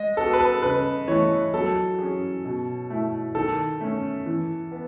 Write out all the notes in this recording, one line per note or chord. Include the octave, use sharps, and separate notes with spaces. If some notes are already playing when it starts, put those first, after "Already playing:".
Already playing: G#3 D#5
B3 F#4 A4
B4
A4
C#3 B4
E3 A3 C#5
F#3 A4
C#4 G#4
B2
A3 E4
D#3 A4
A3 C#4
E3
B3